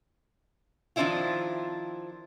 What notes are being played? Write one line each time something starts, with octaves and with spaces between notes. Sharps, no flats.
D#3 F3 C4 D4 E4 F4